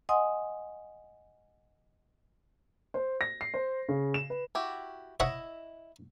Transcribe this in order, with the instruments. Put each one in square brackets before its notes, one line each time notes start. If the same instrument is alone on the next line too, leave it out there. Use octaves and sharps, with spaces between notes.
[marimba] D#5 F#5 G#5 C6 D#6
[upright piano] C5
A#6
C7
C5
C#3
E7
B4
[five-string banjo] E4 F#4 G4
[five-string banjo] E4 D#5 [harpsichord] C#5 E5 F#5